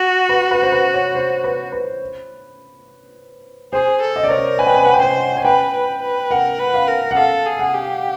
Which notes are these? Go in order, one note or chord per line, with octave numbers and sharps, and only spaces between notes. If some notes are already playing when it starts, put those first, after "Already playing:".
Already playing: F#4
B4
B4
C5
B4
C#5
C5
B4
B4
G#4 C5
A4
D#5
D5
A#4 C#5
D5
B4 G#5
G5
G#5
F#5
G5
C5 G#5
G#5
B4 G5
B4
B4
A#4 F#5
B4
F5
A#4
F#5
A4 F5
G#4
F#5
G4